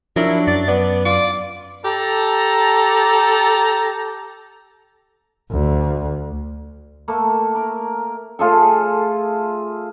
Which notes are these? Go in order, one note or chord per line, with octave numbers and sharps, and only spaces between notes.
F3 F#3 D4 E4 A#4
F#2 D5 A6
B3 D5
F4 D6
G4 A4 A5 A#5
D2
A3 A#3 A4
A#4
A3 F4 G#4 A4